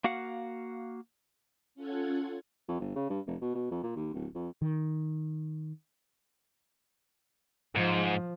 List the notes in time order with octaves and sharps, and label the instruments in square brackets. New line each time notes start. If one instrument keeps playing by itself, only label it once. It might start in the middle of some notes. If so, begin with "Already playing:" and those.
[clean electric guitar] A#3 F#4 F5 F#5
[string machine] C#4 F4 A4 F#5 G#6
[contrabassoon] F2
G1
C#3
G2
F1
B2
B2
F2
A#2
D#2
D1
F2
[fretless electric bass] D#3
[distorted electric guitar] G#2 [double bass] F3